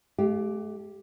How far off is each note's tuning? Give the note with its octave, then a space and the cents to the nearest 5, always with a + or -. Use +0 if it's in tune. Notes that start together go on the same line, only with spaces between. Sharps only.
A3 -45 G4 +0 F5 +5